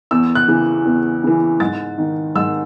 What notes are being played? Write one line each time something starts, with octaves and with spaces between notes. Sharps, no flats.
E2 E6
F#6
C#3 E3
E2
C#3 E3
G#2 A6
D#3
G#2 E6